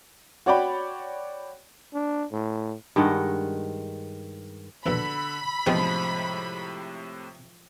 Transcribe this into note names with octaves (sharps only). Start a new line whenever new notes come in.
F#4 C#5 D5 G5 B5
D4
A2
G2 D#3 G#3 F#5
A#1 E2 B2 D3 B5 E6
E2 A2 C3 F3 G#3 C4 G4